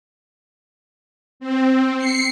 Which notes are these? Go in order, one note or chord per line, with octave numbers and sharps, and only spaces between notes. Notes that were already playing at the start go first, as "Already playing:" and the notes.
C4
C7 C#7